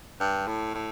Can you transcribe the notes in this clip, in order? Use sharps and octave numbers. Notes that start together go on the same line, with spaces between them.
G2
A2
A2